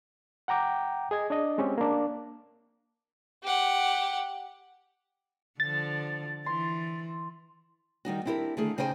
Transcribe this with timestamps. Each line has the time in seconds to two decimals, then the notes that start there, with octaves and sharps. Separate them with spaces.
0.48 F#5 G5 A#5 D6 G6
1.11 G#4 D#5 G#6
1.30 D4 D5 D#5
1.58 G#3 C4 C#4 G4
1.78 A#3 D4
3.43 G4 F#5
5.60 D3 F3 A6
6.46 E3 C6
8.05 D#3 G3 D#4 F#4
8.25 C4 D4 E4 F4 G4 A#4
8.57 D3 D#3 A3 G#4
8.78 C#3 D#4 G4 C5 G5 G#5